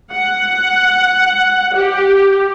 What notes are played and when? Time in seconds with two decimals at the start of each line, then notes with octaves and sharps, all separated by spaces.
0.12 F#5
1.75 G4